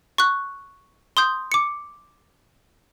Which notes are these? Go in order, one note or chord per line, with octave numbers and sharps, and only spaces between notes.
C#6 F#6
C6 D#6 G6
D6 C#7